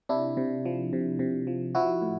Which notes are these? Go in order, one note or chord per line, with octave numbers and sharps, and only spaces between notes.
C3 D4 E4
C3
F3
C3
C3
F3
F3 E4 F#4
A2